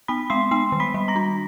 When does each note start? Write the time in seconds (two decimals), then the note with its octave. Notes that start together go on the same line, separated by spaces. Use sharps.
0.08 B3 B5 B6
0.30 G#3 C6 C7
0.51 B3 C6 C7
0.72 D#3
0.80 B5 B6
0.94 G3
1.08 A#5 A#6
1.16 D4